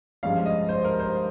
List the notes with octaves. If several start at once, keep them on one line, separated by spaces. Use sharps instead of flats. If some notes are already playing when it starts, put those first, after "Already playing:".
G2 F3 G#3 C#4 F5
D#5
C5
A#4
C5